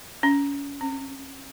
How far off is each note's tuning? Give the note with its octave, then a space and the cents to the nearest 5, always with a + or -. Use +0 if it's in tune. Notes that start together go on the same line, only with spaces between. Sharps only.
C#4 +30
C#4 -40